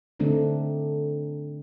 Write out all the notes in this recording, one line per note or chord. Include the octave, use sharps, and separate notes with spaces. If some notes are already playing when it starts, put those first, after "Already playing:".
D3 A3 C4 D4 D#4